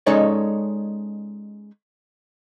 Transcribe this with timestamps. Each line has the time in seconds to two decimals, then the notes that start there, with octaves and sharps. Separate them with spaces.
0.06 G#3 C#4 D#4 A4 C#5 D5